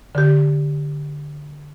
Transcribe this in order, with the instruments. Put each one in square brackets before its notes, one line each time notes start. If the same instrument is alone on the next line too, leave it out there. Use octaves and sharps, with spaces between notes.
[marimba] D3 G4